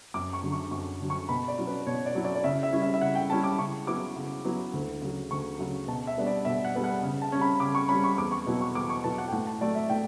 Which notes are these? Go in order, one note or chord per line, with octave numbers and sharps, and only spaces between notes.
F#2 D6
C#6
D3 F#3
C#6
F#2 C#6
D3 F#3
C#6
B2 B5
D5
F#3 C#4 E4
B4
B2 C#5
D5
F#3 C#4 E4
D5
D5
C#3 E5
E5
G3 C#4 E4
E5
E5
C#3 F#5
G5
G3 C#4 E4 A5
D6
C#3 C#6
F#3 B3 E4 D6
C#3
F#3 B3 E4
D2
C#3 F#3
D2 C#6
C#3 F#3
B2 A5
E5
G3 B3 D4
D5
B2 E5
F#5
G3 B3 D4
F#5
C#3
A5
G3 C#4
B5
C#3 D6
C#6
G3 C#4 B5
C#6
E2 D6
C#6
B2 F#3 B3 E4
C#6
E2 D6
C#6
B2 F#3 B3 E4 A5
F#5
G5
A2 F#5
A5
F#3 A3 D5
E5
A2 G5